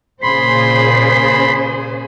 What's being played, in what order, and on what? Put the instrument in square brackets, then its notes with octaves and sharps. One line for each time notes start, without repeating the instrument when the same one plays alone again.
[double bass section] A#2 [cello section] C#3 G#4 C5 [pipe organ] B5 C6